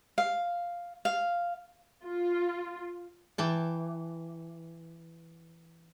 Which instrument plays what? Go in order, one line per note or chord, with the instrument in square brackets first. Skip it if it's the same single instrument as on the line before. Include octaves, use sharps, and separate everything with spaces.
[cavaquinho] F5
F5
[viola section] F4
[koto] E3 G5 A5